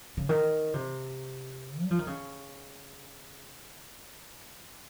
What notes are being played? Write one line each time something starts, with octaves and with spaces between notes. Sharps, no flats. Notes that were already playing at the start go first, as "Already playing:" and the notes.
C#3
D#3
C3
G3
F3
D#3
C#3